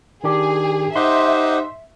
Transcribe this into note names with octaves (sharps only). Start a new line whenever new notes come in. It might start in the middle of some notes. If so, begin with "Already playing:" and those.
D#3 D4 G4 G#4
D#4 G4 C5 E5 F#5 C6